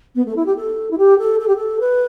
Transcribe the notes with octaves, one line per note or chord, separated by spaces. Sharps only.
B3
A3
E4
G4
A4
E4
G4
A4
A4
G4
A4
B4